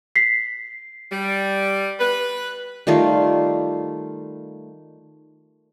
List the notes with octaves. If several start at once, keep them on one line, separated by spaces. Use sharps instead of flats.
B6 C7
G3
B4
D#3 G3 A3 F4